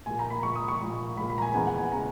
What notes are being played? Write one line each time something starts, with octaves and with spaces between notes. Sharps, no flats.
A#2 A#3 G#5
A#5
B5
A#2 A#3 C#6
D#6
C#6
A#2 A#3
A#2 A#3 B5
B5
A#5
G#5
E2 C#3 G#3 B3 G#5
F#5
G#5
C#3 G#3 B3 A#5